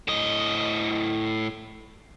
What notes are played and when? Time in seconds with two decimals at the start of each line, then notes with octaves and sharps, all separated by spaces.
0.08 A2 D#5